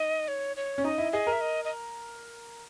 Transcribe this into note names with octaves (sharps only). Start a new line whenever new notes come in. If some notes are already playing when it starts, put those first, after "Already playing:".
Already playing: D#4 D#5
C#5
C#5
C#4
D#4 D#5
E4
G#4 D#5
A#4
E5
D#5
D#5